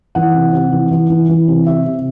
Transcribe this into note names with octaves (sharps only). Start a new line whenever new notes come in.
E3 F#5
C3
C3
E3
E3
E3
E3
C3
C3 E5
C3